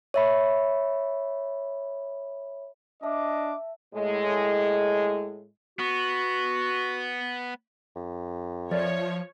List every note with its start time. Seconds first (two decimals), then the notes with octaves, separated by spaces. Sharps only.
0.14 C#5 E5 B5
3.03 D4 D#5 E5 A5 D6
3.94 A2 G#3
5.79 B3 F#4
7.96 F2
8.71 F3 A#4 C#5 D5 E5